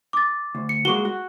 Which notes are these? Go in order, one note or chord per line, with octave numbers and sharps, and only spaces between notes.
D6 A6
D2
C#7
G#3 A#3 F#4 C#6 G7
F#4